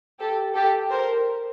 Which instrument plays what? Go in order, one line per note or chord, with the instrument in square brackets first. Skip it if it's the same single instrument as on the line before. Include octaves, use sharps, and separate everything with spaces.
[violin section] G4 A4
G4 A4
A#4 C5